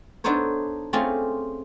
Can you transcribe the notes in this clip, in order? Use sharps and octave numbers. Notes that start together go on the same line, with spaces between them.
B3 D4 D#4 A4 C5 C#5
A3 C4 C#4 F4 G#4 D5